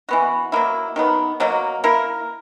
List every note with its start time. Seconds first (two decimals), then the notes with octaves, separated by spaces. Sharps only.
0.09 E3 B3 F#4
0.52 F#3 A#3 E4
0.96 D#3 F#3 B3
1.40 B2 F#3 A#3
1.84 A#3 E4 A#4